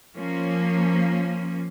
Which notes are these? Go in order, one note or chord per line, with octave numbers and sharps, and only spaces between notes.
F3 A#3 C#4